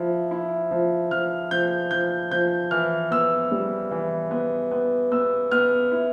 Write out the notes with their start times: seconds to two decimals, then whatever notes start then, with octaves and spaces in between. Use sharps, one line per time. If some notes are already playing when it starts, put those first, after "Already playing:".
Already playing: F3 E4
0.31 E4
0.71 F3
1.11 F3 F6
1.51 F3 G6
1.91 F3 G6
2.31 F3 G6
2.71 E3 F6
3.11 B3 E6
3.51 G3
3.91 E3
4.31 B3
4.71 B3
5.12 B3 E6
5.51 B3 F6
5.92 E4